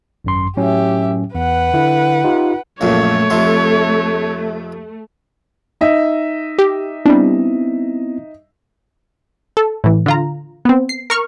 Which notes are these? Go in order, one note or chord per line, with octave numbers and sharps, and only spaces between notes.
G#1 F#2 C6
A2 F#3 C#4 G4 E5
E2 B4 F#5
D3 E4
D#4 F4 G4
A#1 F#2 A#2 A3 C#5
F2 C3 C6
D#4 D#5 E5
G4
G3 B3 C4 D4 E4
A4
A2 E3
D3 F4 A#5
B3 C4
C7
A#4 C#6 F6